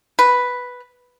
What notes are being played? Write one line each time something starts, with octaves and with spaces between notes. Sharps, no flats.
B4